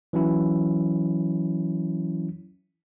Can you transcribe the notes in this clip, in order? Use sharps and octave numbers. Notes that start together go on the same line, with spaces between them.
E3 F#3 C#4 E4